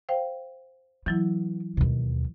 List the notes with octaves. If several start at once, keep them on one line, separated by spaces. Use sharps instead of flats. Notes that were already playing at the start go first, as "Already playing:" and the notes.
C5 F5 G5
E3 F#3 B3 E4
D#2 B2